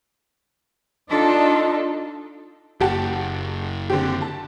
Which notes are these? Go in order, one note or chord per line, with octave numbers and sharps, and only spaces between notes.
D4 D#4 F4 A4 D#5
F#1 G4 F#5 A5
D3 C4 G4
A5